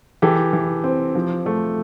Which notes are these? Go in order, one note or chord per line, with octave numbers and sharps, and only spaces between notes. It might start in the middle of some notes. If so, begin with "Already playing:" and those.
E3 G4 A4
E3
C4
F3
A3